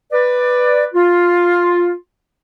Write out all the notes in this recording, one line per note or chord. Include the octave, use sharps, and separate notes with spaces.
B4 D5
F4